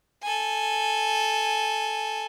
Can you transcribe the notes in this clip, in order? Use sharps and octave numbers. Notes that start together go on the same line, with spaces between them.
A4 G#5